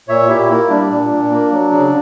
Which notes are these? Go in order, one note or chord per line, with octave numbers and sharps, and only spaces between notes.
A#2 C#5 E5
A#2 E4 G4
A#3 E4
G3 D4
A#2
A#2
A#3
F#3
C#3